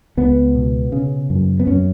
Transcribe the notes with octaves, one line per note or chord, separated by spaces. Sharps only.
C#2 B3
B2
C#3
F#2
B3
F#2 C#4